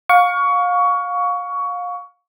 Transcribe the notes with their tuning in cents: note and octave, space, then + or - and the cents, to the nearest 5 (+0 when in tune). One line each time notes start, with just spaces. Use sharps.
F5 +30 C#6 +20